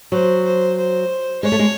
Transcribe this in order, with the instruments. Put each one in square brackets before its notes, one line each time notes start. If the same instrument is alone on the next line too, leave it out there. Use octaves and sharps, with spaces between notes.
[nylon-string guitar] F#3 [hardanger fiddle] C5
[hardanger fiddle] C5
C5
[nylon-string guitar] G#3 [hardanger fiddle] C#5
[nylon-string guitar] A3
G#3